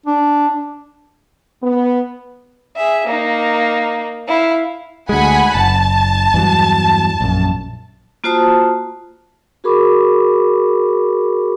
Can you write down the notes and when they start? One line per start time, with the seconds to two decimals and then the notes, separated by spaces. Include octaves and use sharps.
0.06 D4
1.63 B3
2.76 G#4 E5
3.06 A#3 D#4
4.28 E4 F5
5.09 D2 G#3 F#5 G#5 B5
5.55 F#1 A5
6.34 E2 G2 F#3
7.21 A#1 F#2
8.24 A#3 F4 F#4 C5 A5 D#6
9.64 F#4 G#4 A#4 B5 C#6 D6